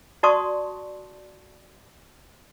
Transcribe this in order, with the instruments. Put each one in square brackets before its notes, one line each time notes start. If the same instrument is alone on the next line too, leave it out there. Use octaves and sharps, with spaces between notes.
[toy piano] F#4 D5 A5 C6 C#6 D#6